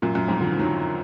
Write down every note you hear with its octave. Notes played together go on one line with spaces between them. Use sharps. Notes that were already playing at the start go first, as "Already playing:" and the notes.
F#2 A#2
F#2
F2 G#2
D3 F3
D#3 F#3